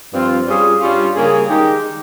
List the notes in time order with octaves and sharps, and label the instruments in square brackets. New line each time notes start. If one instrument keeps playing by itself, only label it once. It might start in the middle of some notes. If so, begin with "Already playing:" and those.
[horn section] G2 F3 C4 F4
G3 C#4 F4 G#4
G2 G3 C#4 F4
C#3 G3 A#3 C#4 G#4
D#3 G#3 D#4 G4